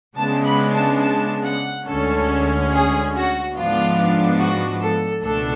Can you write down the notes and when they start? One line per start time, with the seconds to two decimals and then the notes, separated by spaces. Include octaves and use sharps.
0.17 C#3 G#3 B3 D4 A5
0.45 B5
0.74 A5
1.01 A5
1.44 F#5
1.86 D2 D3 G#3 C#4 A4
2.71 G#4
3.13 F#4
3.54 G#2 F3 B3 D4 F4
4.38 F#4
4.81 A4
5.23 C#2 B2 A3 D4 A4